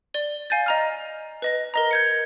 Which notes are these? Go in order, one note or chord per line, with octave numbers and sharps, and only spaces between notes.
D5 G7
F5 G#5 G6 A6
D#5 A#5 F6
B4 D#5 A#6
A#4 D#5 A#5
G6 G#6 C#7